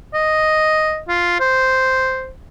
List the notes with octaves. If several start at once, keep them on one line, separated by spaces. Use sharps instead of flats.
D#5
F4
C5